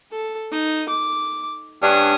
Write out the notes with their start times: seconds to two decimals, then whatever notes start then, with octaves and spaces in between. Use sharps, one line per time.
0.12 A4
0.52 D#4
0.89 D6
1.83 G2 C#4 D4 D#6